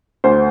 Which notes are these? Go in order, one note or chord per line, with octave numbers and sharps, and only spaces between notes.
D2 C5